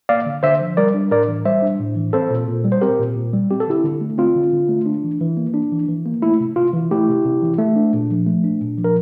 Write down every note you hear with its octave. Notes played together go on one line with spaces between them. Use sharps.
A#3 D5 F5
D3
D3 C5 E5
F3
G3 A#4 D5
D4
A2 A#4 D5
E3
G3 C5 E5
D4
A2
E3
C4 A4 C5
A#2
A#2
G3
C5
C4 G4 A#4
A#2
A#2
G3
C4 G4
A4
D3 E4 G4
D3
A3
C4 F4
D3
D3
A3
D4
E3
E3
A#3
D4
E3
E3
A#3
A3 E4
C3
C3 F4
E3
A3 E4 G4
C3
C3
E3
A3
D4
A#2
F3
A3
D4
A#2
F3
A#4